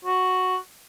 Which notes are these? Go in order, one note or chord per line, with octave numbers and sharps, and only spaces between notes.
F#4